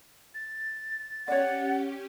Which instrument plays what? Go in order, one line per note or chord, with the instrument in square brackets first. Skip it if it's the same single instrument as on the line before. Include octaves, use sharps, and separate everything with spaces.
[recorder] A6
[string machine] C#4 G4 [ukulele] C#5 D5 [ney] F#5